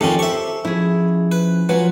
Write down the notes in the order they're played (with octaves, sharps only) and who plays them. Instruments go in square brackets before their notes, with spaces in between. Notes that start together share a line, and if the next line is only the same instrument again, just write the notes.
[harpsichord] F2 D#3 C#4 [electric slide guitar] F4 G4 [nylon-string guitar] A4
[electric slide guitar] G4 C5 [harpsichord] E5 C#6
[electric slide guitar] F3 C#4 [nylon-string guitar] E4 G#4
[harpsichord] B4
[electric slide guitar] F3 F4 [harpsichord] F#3 [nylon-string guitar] B4 G#5